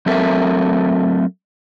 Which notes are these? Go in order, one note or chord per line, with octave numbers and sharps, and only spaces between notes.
F#3 A3 C4 A4 A#4 E5